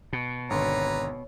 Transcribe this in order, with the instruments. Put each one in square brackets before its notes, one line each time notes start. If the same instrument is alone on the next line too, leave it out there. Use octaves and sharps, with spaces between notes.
[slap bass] B2
[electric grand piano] G#1 D3 C6 [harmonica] B4 A#5 [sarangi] C#5